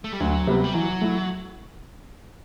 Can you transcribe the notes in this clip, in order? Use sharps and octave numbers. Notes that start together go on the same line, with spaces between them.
A3
G3
D2 F#3
C3 G3 B3
G3
E3 F#3
A3 E4